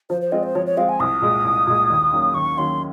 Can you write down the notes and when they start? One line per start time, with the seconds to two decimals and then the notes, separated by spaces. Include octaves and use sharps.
0.10 F3 C5
0.21 C5
0.32 G#3 C4 F4 D#5
0.43 C5
0.55 F3 C#5
0.66 C#5
0.77 G#3 C4 F4 F5
0.89 G#5
1.00 C2 D#6
1.22 A#2 G#3
1.45 C2
1.67 A#2 G#3
1.90 D#2
2.12 D#3 F#3 A#3 C#4
2.34 D#2 C#6
2.57 D#3 F#3 A#3 C#4 C6